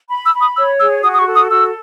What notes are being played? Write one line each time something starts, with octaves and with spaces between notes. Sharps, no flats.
B5
E6
B5
D#6
C#5 E6
G#4 E6
F#4 D#6
D#6
C#6
A4
D#6
F#4 E6